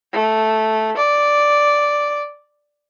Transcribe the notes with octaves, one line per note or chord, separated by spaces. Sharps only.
A3
D5